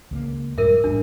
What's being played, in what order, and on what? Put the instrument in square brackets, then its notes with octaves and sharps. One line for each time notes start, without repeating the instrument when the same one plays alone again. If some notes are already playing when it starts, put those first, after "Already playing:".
[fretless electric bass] C#2 F#3 A#3
[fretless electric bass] F2 G#2 G3 [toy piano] A#4 E5
[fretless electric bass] A1 E2 G3 [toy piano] D4